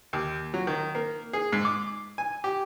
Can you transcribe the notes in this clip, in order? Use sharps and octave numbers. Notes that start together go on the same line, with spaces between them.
D#2
F#3
D#3
A#3
G#4
G#2
D6
G#5
G4